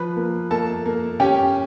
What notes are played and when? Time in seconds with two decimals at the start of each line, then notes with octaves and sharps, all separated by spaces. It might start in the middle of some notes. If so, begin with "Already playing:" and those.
Already playing: F3 B4 B5
0.16 A#3
0.51 A#3 A4 A5
0.86 A#3
1.20 C#4 G4 G5